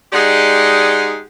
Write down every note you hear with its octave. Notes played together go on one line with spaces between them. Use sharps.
G#3 D#4 G4 G#4 D5 F#5